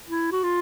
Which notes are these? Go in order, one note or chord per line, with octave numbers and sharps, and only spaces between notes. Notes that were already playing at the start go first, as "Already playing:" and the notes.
E4
F#4
F4